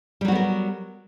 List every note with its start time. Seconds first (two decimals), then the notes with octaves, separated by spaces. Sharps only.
0.21 G3
0.25 F#3
0.28 F#4
0.32 B3
0.35 A#4